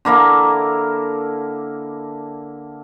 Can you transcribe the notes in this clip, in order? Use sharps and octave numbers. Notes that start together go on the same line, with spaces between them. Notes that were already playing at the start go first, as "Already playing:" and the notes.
D3 A#3 E4 A#4